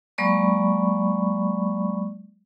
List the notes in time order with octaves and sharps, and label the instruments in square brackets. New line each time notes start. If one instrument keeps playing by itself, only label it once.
[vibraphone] F#3 G#3 A#3 D5 B5 C#6